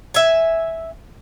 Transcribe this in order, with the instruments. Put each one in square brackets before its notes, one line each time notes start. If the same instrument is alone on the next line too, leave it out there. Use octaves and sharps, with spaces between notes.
[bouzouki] E5 G#5